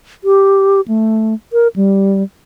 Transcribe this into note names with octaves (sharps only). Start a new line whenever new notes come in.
G4
A3
A#4
G3